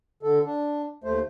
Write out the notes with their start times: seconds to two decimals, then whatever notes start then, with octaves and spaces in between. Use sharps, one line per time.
0.23 D3 A4
0.44 D4
1.04 D#2 A3 C5